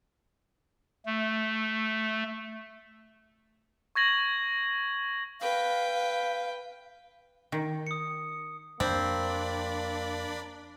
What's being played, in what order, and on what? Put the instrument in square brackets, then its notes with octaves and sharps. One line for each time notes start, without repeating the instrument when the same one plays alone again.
[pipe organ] A3
[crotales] C#6 G#6 A#6 F#7
[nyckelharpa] B4 G5 [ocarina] F5
[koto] D#3
[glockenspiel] D#6 C#7
[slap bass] F2 G3 [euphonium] A#3 [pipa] C4 [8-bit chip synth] D4 D5 B5